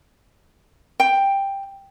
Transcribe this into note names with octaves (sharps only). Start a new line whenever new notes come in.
G5